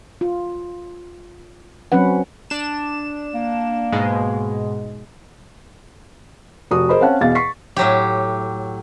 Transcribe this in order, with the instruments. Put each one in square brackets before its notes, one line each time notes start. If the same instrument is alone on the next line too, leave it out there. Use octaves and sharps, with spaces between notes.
[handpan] F4
F#3 C4 C#4 B4 F#5
[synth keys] D4 E7
[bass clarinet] A#3
[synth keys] G#2 B2 G#3
[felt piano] F1 F#4 D#6
G#4 A#4 C5 D#5 B5
C4 C#4 F5 F#5 A5
E2 B2 F5 A6
C#6 B6 C7
[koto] A2 F#3 G4